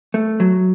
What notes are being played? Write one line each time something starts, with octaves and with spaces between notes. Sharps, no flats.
A3
F#3